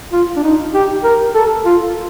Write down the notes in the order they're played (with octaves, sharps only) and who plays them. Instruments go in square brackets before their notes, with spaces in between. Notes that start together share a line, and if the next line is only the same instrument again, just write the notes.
[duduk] F4
D4
D#4
G4
A#4
A4
F4